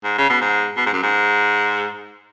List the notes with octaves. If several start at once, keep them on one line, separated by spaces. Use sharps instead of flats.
G#2
C#3
B2
G#2
B2
G#2
F#2
G#2